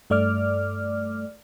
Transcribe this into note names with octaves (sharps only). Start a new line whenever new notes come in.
G2 A3 D5 D6 F6